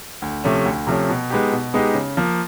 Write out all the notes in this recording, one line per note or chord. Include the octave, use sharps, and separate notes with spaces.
D2
C3 F3 A3 C#4
D2
C3 F3 A3 C#4
B2
G#3 B3 D#4 G4
B2
G#3 B3 D#4 G4
C#3
F3 A#3